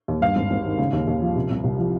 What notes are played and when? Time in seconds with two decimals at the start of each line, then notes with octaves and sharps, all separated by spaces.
0.08 D#2
0.22 G2 F5
0.36 G#1
0.51 G#1
0.65 D#3
0.78 C#3
0.93 D#2
1.07 D#2
1.21 F3
1.36 C3
1.50 C2
1.64 C2
1.79 F3